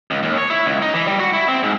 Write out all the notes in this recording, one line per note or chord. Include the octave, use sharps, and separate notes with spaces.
C#2
D#2
C#5
E4
C#2
D#4
E3
G3
F#4
E4
C4
G#2